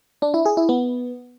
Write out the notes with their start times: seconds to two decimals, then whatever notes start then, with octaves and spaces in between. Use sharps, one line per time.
0.22 D4
0.34 E4
0.46 G#4
0.57 E4
0.69 B3